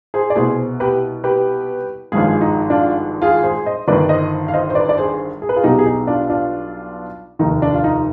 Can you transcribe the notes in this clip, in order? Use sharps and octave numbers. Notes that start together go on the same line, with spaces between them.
G#4 C5
D5
C2 B2 B3 G#4 C5
G4 B4
G4 B4
G#1 G2 F3 G#3 F4 G#4
D#4
D4 F4
F4 G#4
G#4 C5
C5 D#5
G1 G2 D#3 B4 D5
C5 D#5
F5
C5 D#5
C5
B4 D5
D5
G#4 C5
G#4
B4
F4 G#4
B1 B2 G3 B3 D#4 G4
G#4
D#4 G4
D4 F4
D4 F4
F1 D#2 D#3 D#4
D4
F4
D#4